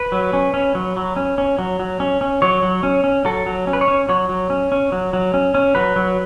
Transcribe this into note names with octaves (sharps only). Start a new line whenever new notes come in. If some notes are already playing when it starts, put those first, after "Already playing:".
Already playing: B4
F#3
C#4
C#4
F#3
F#3
C#4
C#4
F#3
F#3
C#4
C#4
F#3 C#5
F#3
C#4
C#4
F#3 A4
F#3
C#4
B4
C#5
C#4
F#3 C#5
F#3
C#4
C#4
F#3
F#3
C#4
C#4
F#3 B4
F#3